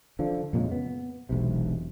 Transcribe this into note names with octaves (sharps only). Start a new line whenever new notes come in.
D3 F3
F2 A#2 C#3 G#3
B3
E1 B1 C3